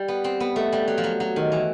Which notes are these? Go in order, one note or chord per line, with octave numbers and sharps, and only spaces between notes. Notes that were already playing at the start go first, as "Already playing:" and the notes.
Already playing: G3
B3
C4
B3
A3
G3
F#3
F3
F#3
F#3
D#3
E3